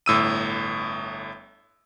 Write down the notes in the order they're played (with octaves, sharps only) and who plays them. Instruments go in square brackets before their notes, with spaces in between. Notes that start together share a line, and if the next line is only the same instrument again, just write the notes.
[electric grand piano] G1 A2 E6 D#7